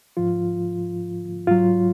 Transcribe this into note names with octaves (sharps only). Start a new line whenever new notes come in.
G#2 F3 F4
G#2 F#3 F4